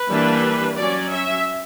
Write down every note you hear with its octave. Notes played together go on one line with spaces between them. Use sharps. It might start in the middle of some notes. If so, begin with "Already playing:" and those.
Already playing: B4
E3 G3 A#3 D4
F#3 C#4 D5
E5